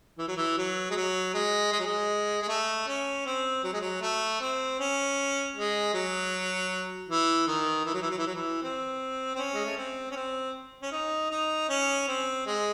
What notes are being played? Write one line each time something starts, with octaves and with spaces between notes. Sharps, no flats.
E3
F#3
E3
F#3
G#3
F#3
G#3
G#3
F#3
G#3
G#3
A3
C#4
C4
F#3
G#3
F#3
A3
C4
C#4
G#3
F#3
E3
D#3
E3
F#3
E3
F#3
E3
F#3
E3
C4
C4
C#4
G#3
A3
C4
C#4
C4
C#4
D#4
D#4
C#4
C4
G#3